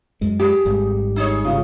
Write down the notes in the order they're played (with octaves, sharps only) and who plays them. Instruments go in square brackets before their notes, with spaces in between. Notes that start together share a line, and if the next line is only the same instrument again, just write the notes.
[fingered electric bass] F#2 G#3
[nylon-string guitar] G4 [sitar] G#4
[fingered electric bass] G#1 G#2 G3
[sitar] D#4 G#4 C#5
[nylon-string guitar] C#3 F4